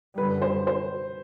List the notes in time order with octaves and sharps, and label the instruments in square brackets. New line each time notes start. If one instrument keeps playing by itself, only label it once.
[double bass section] F#2 D3 G3 [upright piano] B4
[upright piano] C5
C5